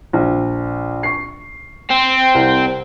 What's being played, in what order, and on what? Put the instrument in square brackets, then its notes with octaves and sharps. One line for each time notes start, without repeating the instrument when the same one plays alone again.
[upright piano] A#1
C#6 C7
[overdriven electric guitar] C4
[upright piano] C2